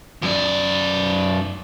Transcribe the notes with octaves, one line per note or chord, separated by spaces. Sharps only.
F#2 D5